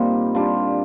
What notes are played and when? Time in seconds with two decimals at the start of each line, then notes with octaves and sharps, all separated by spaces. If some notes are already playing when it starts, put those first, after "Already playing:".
Already playing: A#2 G3 C4 D#4
0.35 G3 D4 F4